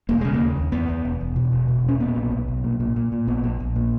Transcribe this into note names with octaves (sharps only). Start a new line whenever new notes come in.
E1 A#3
C#3 G#3
A#3
D#2
D#2
E2 B3
E2
E1
E1
B2
E1
B2
E1 C#4
A#2 B3
B1
B1
B1
A#2
A#2
A#2
A#2
A#1 B3
A#1
A#1
A#2